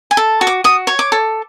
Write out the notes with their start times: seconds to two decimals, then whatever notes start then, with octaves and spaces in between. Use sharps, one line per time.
0.11 G#5
0.17 A4
0.41 F#4
0.47 D6
0.64 F#4 D#6
0.87 C#5
0.99 D6
1.12 A4